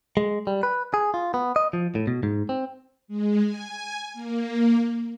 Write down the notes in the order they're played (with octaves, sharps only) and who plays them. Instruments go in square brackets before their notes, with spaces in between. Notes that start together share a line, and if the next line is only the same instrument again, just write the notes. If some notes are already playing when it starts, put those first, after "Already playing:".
[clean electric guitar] G#3
G3
B4
G#4
F4
B3
D#5
F3
A2
B2
G#2
C4
[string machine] G#3
G#5
A#3